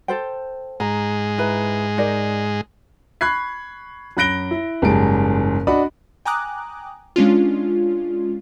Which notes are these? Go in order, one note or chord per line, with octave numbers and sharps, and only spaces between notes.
A4 C5 G5
G#2 G#3 A#5
E4 B4 A#5
D#4 A#4 D5
B5 C#6 F#6 G#6 C7
F#2 B5 F#6 A#6 D7 G7
E4
F#1 G#2 G3 G#4 A5 D7
D4 F#4 D#5 B5
G5 G#5 A#5 D6 D#6 F#6
G#3 C#4 D4 F4